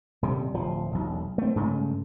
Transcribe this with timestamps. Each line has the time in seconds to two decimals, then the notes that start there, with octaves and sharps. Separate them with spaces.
0.22 D#1 C3 G3
0.54 D1 F3
0.92 E1 B1
1.38 A3 C4
1.55 G2 C#3 G#3 A3